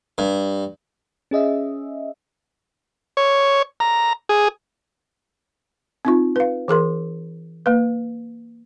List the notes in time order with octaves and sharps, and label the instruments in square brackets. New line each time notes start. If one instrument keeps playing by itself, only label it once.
[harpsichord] G2
[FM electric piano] C#4 G#4 D#5 E5
[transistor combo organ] C#5
A#5
G#4
[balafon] C4 D#4 F4
B4 F5
E3 G#4 A#4 C6
A#3 B4